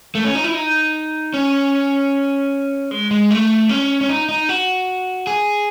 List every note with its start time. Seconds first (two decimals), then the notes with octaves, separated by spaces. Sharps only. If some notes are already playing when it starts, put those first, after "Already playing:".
0.15 A3
0.24 C#4
0.35 D#4
0.44 E4
0.54 D#4
1.34 C#4
2.91 G#3
3.11 G#3
3.31 A3
3.69 C#4
4.01 C#4
4.09 D#4
4.29 D#4
4.49 F#4
5.27 G#4